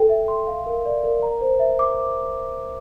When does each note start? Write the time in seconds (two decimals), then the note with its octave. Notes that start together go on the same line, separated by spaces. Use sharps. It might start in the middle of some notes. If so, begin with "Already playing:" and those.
Already playing: A4 G5
0.09 E5
0.28 C6
0.47 F5
0.66 A#4
0.85 D5
1.03 A#4
1.22 A#5
1.41 C5
1.59 E5
1.79 D6